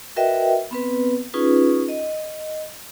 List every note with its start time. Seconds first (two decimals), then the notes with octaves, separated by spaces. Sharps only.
0.16 F#4 A#4 B4 D#5 E5 G5
0.71 B3 C4 B4
1.34 C#4 D#4 F4 G#4 B4
1.89 D#5